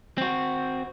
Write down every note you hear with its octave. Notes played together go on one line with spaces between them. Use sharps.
C4 F#4